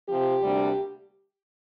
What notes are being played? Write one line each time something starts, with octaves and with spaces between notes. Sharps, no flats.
C3 F3 C4 G4
D2 C3 G3 A#3 D4